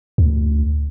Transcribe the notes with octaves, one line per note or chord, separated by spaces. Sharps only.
D2